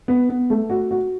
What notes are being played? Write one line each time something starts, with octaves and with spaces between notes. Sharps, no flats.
B3
B3
A3
F#4
F#4